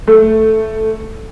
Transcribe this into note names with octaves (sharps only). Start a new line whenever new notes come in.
A3